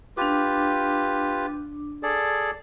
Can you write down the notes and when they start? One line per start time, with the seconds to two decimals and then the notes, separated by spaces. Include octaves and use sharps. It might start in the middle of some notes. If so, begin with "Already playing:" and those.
0.17 D4 F4 G4 B4 D6
2.03 G#4 A4 D5